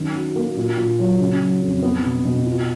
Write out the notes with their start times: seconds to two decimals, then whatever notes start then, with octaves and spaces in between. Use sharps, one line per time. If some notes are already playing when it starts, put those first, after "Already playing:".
Already playing: F#2 D#3
0.14 F#4
0.36 A#3
0.57 A#2
0.77 A#2
0.99 F#3
1.20 C#3
1.40 F#3
1.62 F2
1.82 B3
2.04 B2
2.25 B2
2.46 F4